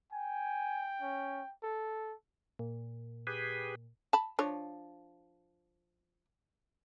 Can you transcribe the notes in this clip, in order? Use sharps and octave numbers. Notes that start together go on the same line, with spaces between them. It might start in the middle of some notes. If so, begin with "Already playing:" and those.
G5 G#5
C#4
A4
A#2
G4 G#4 B4
A5 B5
F3 D4 C#5